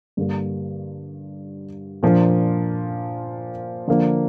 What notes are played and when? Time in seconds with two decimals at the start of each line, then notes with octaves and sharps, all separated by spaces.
0.17 G2 D3 G3 A#3
2.03 A#2 F3 A#3 D4 F4
3.87 D3 F3 A#3 D4